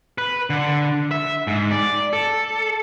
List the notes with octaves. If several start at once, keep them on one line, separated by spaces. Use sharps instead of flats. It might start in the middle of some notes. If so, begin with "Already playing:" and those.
B4
D3
E5
G#2
D5
A4